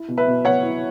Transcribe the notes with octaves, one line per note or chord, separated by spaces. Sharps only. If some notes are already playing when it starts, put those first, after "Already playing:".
Already playing: E4
B2
B4 E5
B2
B3 C#5 F#5
E4